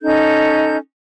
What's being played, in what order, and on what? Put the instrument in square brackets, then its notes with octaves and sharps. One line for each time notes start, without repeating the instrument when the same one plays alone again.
[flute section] C#4 D#4 A4 G6